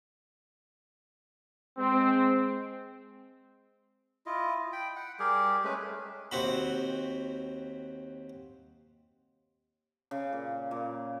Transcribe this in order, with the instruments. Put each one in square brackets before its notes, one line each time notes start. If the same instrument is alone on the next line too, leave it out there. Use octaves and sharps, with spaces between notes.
[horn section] G#3 C4
[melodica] E4 F4 D#5
G5 B5
F#5
G3 G4 G#4 A#4
G#3 A3 C#4 B4
[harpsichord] D#2 C4 F#4 B5
[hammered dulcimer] C#3
A#2
A#2